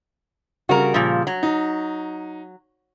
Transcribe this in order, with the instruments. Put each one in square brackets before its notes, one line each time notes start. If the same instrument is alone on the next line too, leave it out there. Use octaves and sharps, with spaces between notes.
[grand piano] C#3 G3 [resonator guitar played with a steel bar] F#4 A#4
[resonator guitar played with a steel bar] A#2 F3
F#3
[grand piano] D#4